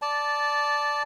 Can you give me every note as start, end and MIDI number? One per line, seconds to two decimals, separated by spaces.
0.02 1.03 74
0.02 1.03 81